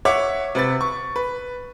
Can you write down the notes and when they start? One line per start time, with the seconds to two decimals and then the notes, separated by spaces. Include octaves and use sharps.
0.05 C#5 E5 F#5 D6
0.55 C3 B4 A6
0.81 C#6
1.16 B4